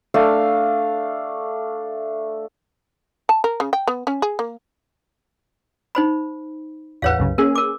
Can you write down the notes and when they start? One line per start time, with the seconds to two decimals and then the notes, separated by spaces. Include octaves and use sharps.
0.14 A3 D4 F5
3.29 A5
3.44 A#4
3.60 C#3
3.73 G5
3.87 B3
4.07 C#4
4.22 G#4
4.39 A#3
5.95 D#4 C5 B5
7.02 A1 E2 B4 C#5 F5 F#5
7.18 C2 F#2 C#3
7.38 A#3 C#4 G#4 A#4
7.55 A#4 D6